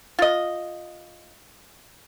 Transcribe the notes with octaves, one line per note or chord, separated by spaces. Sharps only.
F4 D#5